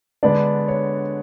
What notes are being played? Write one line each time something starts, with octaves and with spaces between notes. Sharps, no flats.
D3 G#3 B3 D4 D5
C#5